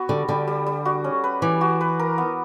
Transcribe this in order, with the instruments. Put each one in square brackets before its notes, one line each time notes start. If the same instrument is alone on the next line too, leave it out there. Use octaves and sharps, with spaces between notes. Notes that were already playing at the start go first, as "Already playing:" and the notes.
Already playing: [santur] B3 F#4
[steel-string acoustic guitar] D3 [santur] G3
[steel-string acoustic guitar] D3 [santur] G3
[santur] G3
G3
F#4
C#4
B4
[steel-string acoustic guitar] E3 [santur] D5
[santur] F#4
B4
A#4
B3